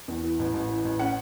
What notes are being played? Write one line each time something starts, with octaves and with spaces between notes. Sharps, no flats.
E2
E3
A1
A1
E3
A1
C#4 F#5